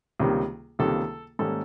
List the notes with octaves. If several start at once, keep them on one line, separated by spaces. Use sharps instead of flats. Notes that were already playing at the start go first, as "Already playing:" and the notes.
C#2 C3 D#3 G3 A#3
C#2 C3 D#3 G3 A#3 A4
G#2 D#3 G3 A#3 C#4 A4